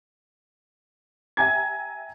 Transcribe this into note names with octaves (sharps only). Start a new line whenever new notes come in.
E5 G5 G#5 A#5 G#6